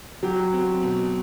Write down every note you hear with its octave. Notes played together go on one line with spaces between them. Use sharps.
F#3 G4
C4
B2